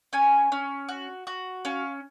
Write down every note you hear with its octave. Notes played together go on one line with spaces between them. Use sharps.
C#4 G#5
C#4
F#4
F#4
C#4 F5